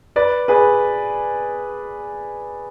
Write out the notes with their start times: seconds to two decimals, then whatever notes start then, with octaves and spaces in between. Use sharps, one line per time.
0.16 B4 D5
0.48 G#4 B4